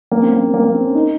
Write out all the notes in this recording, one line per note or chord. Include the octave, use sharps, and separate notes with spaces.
A#3
C4
A#3
C4
A#3
A#3
C4
C#4
D#4